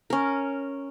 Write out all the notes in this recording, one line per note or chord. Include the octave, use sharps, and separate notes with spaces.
C#4 A#4